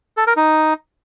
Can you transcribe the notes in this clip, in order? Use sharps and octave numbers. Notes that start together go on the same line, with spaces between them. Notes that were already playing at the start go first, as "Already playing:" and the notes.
A4
A#4
D#4